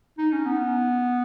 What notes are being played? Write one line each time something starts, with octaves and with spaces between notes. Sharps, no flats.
D#4
C#4
B3